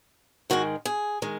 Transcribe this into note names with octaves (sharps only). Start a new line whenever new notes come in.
G#2 D#3 G#3 F#4
G#4
D#3 G#3